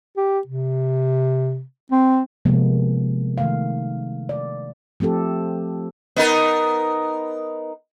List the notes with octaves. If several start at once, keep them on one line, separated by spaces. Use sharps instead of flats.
G4
C3
C4
C3 F3 G#3 A#3 B3
D#3 A3 F5
D5
F3 A3 C4 G4 A4
B3 D#4 A#4